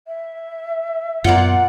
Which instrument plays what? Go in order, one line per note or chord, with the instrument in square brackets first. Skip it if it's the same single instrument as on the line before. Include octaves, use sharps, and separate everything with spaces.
[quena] E5
[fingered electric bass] F#2 B3 [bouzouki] A#2 F#5 [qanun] F4 D5